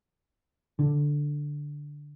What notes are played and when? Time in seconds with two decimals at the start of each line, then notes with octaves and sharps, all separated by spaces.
0.79 D3